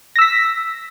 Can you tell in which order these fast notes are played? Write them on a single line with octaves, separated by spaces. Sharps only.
A#6 E6 B6